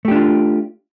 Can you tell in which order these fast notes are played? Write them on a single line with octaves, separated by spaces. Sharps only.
A3 G4 D4 F4